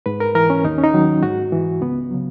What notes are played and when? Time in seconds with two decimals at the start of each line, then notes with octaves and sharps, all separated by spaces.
0.06 G#2 B4
0.20 A#4
0.35 E3 A#4
0.50 C#4
0.65 D#2 D#4
0.78 C#4
0.84 D#4
0.93 D#3 F#3
1.23 G#2 F#4
1.53 E3
1.81 C#2 B3
2.11 C#3 F#3